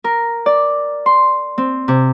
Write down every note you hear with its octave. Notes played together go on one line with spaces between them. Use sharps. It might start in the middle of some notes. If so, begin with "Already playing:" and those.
A#4
D5
C6
C4
C3